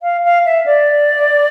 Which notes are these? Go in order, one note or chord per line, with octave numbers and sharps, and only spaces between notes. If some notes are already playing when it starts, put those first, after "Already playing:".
F5
F5
E5
D5